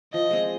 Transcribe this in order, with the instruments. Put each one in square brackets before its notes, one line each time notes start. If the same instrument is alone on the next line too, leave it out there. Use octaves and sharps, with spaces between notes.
[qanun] F3 [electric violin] D#5
[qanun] G#3 C4